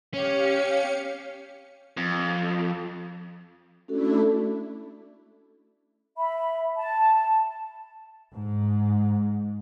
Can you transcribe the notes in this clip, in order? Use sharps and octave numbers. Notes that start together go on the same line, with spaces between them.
C#4 G4 C#5 F5 C#7
F2
A3 C#4 D4 E4 F#4 A4
E5 B5
A5
G#2